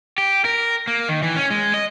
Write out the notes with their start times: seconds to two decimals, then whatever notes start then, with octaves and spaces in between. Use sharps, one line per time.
0.18 G4
0.45 A#4
0.87 A#3
1.09 D#3
1.23 E3
1.36 C#4
1.50 G#3
1.74 D#5